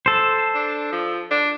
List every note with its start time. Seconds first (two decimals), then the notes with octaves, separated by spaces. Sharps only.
0.06 A4 C5
0.55 D4
0.92 F3
1.31 D4